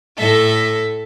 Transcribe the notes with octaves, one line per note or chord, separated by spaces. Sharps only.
A2 A4 E5